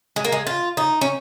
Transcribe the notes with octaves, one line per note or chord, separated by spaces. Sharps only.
G#3
A#3
G#3
F4
D#4
C#4